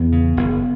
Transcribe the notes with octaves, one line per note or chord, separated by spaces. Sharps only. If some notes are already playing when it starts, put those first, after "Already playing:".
Already playing: E2 B3
C#3
F#1